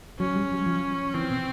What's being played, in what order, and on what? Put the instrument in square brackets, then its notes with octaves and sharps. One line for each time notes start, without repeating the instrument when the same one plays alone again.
[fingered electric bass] F#3 [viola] C#4
[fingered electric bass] G3
F#3
F3
[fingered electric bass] E3 [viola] C4
[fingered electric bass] B2